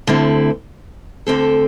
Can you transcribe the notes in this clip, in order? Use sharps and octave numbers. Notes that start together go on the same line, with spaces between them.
D2 D3 C4 E4
D2 D3 C4 A4